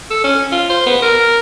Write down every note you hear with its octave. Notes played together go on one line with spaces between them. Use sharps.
A4
C#4
F4
C5
B3
A#4